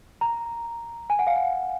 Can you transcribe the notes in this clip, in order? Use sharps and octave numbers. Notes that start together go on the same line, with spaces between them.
A#5
G#5
F#5
F5
F#5